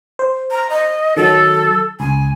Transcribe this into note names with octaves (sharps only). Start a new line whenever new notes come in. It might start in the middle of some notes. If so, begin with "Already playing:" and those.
C5
A#5
D#5
D#3 F#3 A4
C#2 G#5